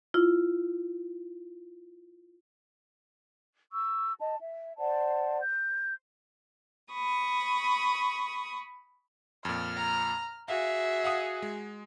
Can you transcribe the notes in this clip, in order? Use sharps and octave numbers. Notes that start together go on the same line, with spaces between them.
E4 F4
C#6 E6
D#5 A5
E5
C5 D5 F#5 A5
G6
B5 C#6 D#6
F2 A#2 F6
A#5
F#4 G#4 E5 F5
F5 F#5 D#6
G#3